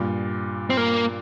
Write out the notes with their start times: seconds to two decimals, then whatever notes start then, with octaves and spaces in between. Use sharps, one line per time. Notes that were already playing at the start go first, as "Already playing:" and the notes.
Already playing: G2 A#2
0.70 C4
0.77 A#3